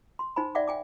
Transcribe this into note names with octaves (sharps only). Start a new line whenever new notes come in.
C6
D#4 C5 G#5 B5
D5 E5 F#5 G5 D6
G5 G#5 D6